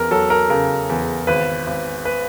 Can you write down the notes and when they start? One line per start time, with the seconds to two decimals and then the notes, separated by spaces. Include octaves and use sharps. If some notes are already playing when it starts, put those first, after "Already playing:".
Already playing: E2 A#4
0.11 F#3 A4
0.30 A#4
0.50 C#3 A#4
0.89 E2
1.27 G#1 B4
1.67 G#1
2.05 B4